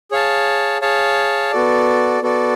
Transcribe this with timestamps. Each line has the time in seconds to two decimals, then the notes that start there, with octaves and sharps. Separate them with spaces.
0.11 G#4 C#5 F5 A5
0.82 G#4 C#5 F5 A5
1.52 B3 F#4 A4 D5
2.22 B3 F#4 A4 D5